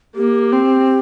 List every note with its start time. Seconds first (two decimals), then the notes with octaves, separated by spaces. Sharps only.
0.16 A#3 G4
0.52 C4